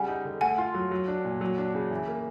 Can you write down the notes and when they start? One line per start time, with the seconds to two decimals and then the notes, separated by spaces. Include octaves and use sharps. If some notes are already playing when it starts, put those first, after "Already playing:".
Already playing: C#3 G3 F#5 G#5
0.08 D#4
0.25 D3
0.41 A3 F#5 G#5
0.58 F4
0.75 F#3
0.91 F#3
1.08 D4
1.25 A#2
1.41 F#3
1.58 D4
1.75 C#3
1.91 E3
2.08 A#3